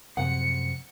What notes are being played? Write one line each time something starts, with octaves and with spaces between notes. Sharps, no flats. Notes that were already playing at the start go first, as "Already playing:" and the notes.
F#2 C3 F3 F#5 C#7